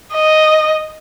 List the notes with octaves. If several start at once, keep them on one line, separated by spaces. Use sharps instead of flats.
D#5